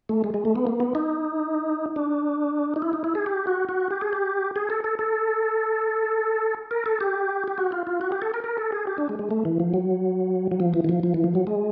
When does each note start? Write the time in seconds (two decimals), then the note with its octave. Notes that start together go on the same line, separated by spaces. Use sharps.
0.09 A3
0.24 G#3
0.34 G#3
0.45 A3
0.56 B3
0.67 A#3
0.80 B3
0.95 D#4
1.96 D4
2.76 D#4
2.82 E4
2.93 D#4
3.04 E4
3.15 G#4
3.26 G4
3.47 F#4
3.69 F#4
3.91 G4
4.01 G#4
4.13 G4
4.56 G#4
4.70 A4
4.84 A4
4.99 A4
6.71 A#4
6.86 A4
7.01 G4
7.48 G4
7.58 F#4
7.72 F4
7.87 F4
8.01 F#4
8.12 G4
8.22 A4
8.34 A#4
8.44 A#4
8.58 A4
8.72 G#4
8.87 G4
8.98 D4
9.09 G#3
9.19 G#3
9.31 A3
9.45 E3
9.60 F3
9.74 F#3
10.52 F#3
10.60 F3
10.74 E3
10.84 E3
10.89 F3
11.03 F3
11.14 E3
11.24 F3
11.35 F#3
11.47 G#3